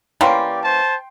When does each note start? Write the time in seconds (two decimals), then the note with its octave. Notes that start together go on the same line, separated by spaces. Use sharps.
0.21 E3 A#3 C#4 G4 D5 G5 C6
0.63 C5 A5